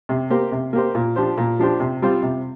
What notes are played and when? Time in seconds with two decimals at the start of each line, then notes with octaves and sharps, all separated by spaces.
0.09 C3
0.30 A#3 G4 C5
0.52 C3
0.73 A#3 G4 C5
0.95 A#2
1.16 F3 D4 G4 C5
1.37 A#2
1.59 F3 D4 G4 C5
1.80 C3
2.02 G3 C4 F4 C5
2.23 C3